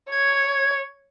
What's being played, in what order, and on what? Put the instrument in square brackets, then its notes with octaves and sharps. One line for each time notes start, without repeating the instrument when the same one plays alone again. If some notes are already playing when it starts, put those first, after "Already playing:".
[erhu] C#5 [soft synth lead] G#6